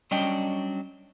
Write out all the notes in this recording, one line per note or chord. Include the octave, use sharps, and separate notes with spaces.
F#3 G3 C#4 D4 D#5 G5